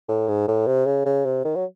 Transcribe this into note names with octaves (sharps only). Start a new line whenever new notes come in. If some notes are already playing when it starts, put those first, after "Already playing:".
A2
G#2
A2
C3
C#3
C#3
C3
D#3
F#3